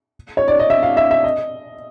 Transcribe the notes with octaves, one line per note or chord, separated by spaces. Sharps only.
C#5
D5
D#5
E5
F5
E5
E5
D#5